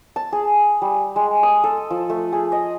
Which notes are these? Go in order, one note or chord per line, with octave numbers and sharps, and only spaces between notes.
A5
G#4
G3
G#3
D#6
A4
F3
A3
G#4
D#5